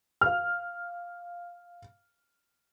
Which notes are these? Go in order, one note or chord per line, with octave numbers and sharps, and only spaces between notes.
F5 F6